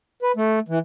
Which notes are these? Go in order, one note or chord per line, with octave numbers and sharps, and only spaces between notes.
B4
A3
E3